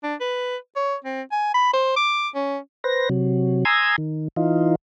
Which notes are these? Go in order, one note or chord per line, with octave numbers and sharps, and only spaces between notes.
D4
B4
C#5
C4
G#5
B5
C5
D6
C#4
B4 C5 A#6
C3 F#3
G#5 A#5 C6 D#6 E6 G#6
D#3
E3 D#4 F4